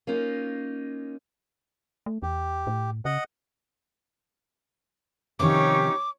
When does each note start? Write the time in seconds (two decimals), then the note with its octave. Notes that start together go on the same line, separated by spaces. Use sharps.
0.07 A#3 C#4 D#4 F4
2.06 A3
2.22 E2 G4
2.67 A2
3.05 C#3 D#5 F#5
5.39 C3 D#3 F3 C#4 D#4 G4 C#5 D6